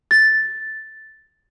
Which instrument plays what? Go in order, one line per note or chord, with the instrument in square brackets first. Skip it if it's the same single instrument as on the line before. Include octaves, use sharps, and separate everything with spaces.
[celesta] A6